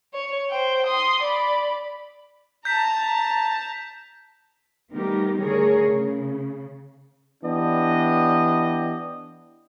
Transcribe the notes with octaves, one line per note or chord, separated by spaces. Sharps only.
C#5
C5 G5
C6 D#6
D5 B5
A5 A#5 G6 B6
D#3 G3 A3 B3 G4 A#4
D3 A3 G#4 A#4 C#5
C#3
E3 B3 D4 G4 D#5